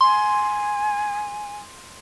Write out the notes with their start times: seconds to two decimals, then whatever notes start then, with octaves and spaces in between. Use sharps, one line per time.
0.01 G#5 C6